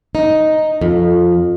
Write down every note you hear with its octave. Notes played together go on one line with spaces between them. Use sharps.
D#4
F2